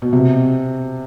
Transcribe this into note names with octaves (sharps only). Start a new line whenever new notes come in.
B2
C3